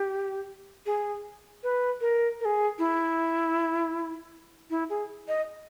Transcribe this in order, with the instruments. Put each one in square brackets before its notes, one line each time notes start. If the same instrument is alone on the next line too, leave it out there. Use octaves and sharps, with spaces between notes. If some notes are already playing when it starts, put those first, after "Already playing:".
Already playing: [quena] G4
G#4
B4
A#4
A#4
G#4
E4
E4
G#4
D#5